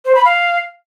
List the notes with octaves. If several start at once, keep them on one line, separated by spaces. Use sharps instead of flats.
C5
B5
F5